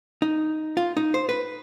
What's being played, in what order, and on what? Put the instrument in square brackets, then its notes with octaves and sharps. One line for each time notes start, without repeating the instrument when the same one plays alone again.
[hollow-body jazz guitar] D#4
F4
D#4
C5
B4